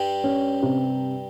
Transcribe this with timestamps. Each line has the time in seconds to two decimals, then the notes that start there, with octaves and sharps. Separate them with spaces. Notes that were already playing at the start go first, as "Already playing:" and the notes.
Already playing: G2 G3
0.24 C#4
0.63 C3